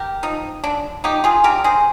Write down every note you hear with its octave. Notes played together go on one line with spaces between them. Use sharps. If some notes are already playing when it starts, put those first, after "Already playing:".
Already playing: G4 A#4
F3 D#4
D3 D4
F3 D#4 G4
F4 G#4
D3 G4 A#4
G#4 C5